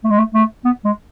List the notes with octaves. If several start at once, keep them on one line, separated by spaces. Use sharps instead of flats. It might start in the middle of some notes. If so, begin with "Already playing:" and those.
A3
G#3
A3
A3
B3
G#3